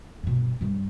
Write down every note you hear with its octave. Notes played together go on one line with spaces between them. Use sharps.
G2 B2
G2 G3